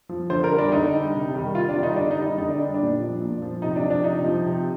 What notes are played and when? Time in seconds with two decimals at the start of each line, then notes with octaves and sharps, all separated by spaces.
0.09 F3
0.30 D3 C5
0.44 A#4
0.52 G3
0.58 D4
0.72 D3 D#4
0.93 G3
1.13 C3
1.34 D#3 G3
1.54 C3 F4
1.69 D4
1.75 D#3 G3
1.83 D#4
1.96 D3 D4
2.11 D#4
2.17 G3
2.24 D#4
2.38 D3 D#4
2.50 D4
2.59 G3
2.74 D4
2.79 A#2
3.00 F3
3.21 A#2
3.42 F3
3.62 C3 D#4
3.76 D4
3.83 F3
3.90 D4
4.04 C3 D#4
4.24 F3
4.46 C3